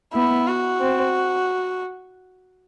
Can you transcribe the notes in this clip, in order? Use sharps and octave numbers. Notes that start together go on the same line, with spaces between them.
B3 E4
F#4
C4